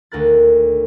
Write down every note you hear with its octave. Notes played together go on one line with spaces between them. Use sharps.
D#1 D2 A3 A#4 F#6 A6